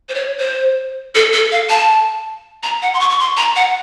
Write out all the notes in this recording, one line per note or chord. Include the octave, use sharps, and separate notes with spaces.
C5
C#5
C5
A4
A4
F5
A5
A#5
F#5
C6
C#6
C#6
C6
A#5
F#5